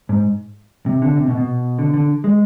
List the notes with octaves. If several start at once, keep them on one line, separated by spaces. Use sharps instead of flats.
G#2
C3
D3
C3
B2
B2
D3
D3
G#3